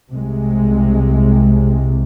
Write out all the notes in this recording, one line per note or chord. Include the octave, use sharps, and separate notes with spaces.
C2 C3 G#3